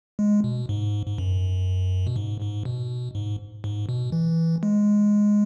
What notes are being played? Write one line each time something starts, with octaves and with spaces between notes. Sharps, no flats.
G#3
B2
G#2
G#2
F#2
B2
G#2
G#2
B2
G#2
G#2
B2
E3
G#3